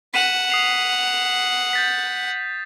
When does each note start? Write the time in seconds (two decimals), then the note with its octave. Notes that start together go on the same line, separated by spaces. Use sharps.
0.14 F#5 B6 D#7 E7
0.50 D#6 C7 F7
1.73 G6 A6 B6